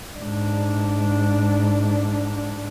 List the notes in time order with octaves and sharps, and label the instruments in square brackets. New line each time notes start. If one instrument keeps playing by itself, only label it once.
[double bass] G#2 D4